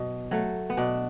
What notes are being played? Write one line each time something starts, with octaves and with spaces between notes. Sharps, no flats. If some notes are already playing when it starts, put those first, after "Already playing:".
Already playing: B2 F#3
F#3 A3
B3
B2 D4